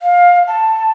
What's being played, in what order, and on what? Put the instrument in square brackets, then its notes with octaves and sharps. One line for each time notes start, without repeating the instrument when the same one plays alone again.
[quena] F5
A5